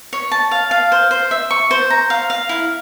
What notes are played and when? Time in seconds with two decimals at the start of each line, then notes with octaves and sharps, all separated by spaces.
0.13 C#5
0.32 A5
0.51 F5
0.71 F5
0.92 C5
1.11 C5
1.31 E5
1.51 C#6
1.71 C5
1.90 A#5
2.10 F5
2.30 F5
2.49 E4